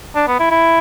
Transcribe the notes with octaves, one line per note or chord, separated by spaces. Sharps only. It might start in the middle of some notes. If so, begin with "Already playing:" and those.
D4
B3
E4
E4